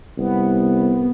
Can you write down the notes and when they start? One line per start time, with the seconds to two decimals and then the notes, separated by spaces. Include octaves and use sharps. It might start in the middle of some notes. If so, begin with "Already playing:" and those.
0.18 C2 B3